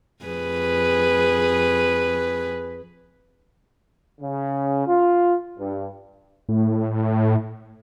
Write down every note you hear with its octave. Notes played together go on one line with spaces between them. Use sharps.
F2 G#4 B4
C#3
F4
G2
A2